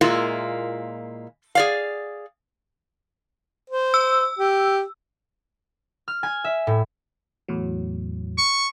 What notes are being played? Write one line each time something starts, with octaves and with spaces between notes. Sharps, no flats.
A#2 G#3 A#3 E4 F4
G#4 D5 F5
C5
E6
G4
F6
G#5
E5
A2
E2 A2 F#3
C#6